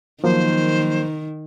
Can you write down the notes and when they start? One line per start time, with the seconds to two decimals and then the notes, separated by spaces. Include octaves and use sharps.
0.24 D#3 F3 F#3 A#3 C5